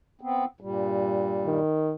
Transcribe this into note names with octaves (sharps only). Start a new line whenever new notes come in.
B3 C4
G2 A#2 G3
D#3